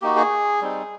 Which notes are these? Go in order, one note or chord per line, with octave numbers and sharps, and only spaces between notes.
A#3 D#4 F#4 G4
G#4
G3 C4 D#4